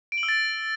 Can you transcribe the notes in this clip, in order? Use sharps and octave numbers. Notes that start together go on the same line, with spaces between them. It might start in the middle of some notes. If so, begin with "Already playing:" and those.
D7
F#7
E6
A6